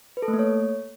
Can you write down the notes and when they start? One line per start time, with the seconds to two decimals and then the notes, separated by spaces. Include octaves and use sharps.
0.17 B4
0.22 A4
0.28 A3
0.33 A#3
0.39 C#5